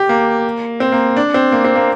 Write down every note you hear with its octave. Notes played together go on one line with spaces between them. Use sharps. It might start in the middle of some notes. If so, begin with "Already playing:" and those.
Already playing: G4
A#3
C4
A#3
D4
C4
A#3
C4
A#3